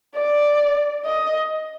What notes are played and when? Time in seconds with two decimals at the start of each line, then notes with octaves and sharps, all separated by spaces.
0.16 D5
1.05 D#5